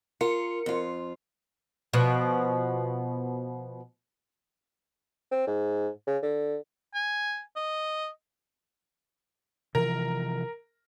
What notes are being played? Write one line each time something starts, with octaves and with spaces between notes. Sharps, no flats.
F4 A#4 C#7
F2 F4
B2 F3
C4
G#2
C#3
D3
G#5
D#5
C3 E3 F3 A#4